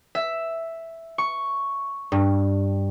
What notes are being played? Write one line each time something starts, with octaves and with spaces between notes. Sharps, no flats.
E5
C#6
G2